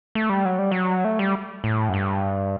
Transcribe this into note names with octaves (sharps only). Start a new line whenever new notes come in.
A3
G3
F#3
G3
F#3
A3
G3
A2
F#2
G2